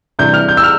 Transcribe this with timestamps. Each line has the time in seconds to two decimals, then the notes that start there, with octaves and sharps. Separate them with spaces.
0.19 C3 E3 G3 D4 G6
0.34 F6
0.49 G6
0.57 E6
0.63 F6